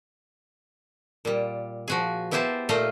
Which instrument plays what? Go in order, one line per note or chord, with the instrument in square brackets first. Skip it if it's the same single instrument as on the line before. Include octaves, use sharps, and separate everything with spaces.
[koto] A#2 G3
F3 F#4 G#4
B3 E4 G4 G#4 C5 A5
A#2 A3 D#4 D#5 F5 A#5